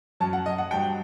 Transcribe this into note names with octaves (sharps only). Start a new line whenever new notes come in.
F#2 F#3 A5
F#5
D#5
F#5
G2 F#3 G5